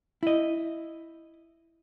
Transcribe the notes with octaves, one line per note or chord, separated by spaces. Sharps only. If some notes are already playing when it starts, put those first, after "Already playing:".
E4 D#5